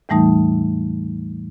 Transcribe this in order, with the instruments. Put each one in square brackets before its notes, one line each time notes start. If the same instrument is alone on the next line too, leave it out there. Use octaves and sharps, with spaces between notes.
[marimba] E2 A2 E3 G3 A3 D#4